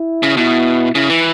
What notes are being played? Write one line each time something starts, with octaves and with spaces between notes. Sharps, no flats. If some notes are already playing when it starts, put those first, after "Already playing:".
Already playing: E4
C#3
B2 E4
C#3 E4
E3